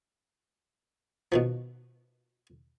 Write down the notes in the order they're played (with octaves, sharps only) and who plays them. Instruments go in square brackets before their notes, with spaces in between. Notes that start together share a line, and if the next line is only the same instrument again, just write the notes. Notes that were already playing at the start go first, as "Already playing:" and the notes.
[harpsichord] B2 D#3 F3